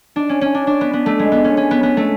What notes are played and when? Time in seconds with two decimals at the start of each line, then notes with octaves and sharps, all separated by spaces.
0.16 D4
0.29 C#4
0.41 C#4
0.54 D4
0.67 D4
0.81 B3
0.93 B3
1.06 A3
1.19 G#3
1.32 B3
1.44 C#4
1.57 C#4
1.71 B3
1.83 B3
1.97 A3